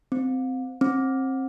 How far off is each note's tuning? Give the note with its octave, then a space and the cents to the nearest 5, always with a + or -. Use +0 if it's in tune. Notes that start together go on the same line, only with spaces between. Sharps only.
C4 -15
C4 +25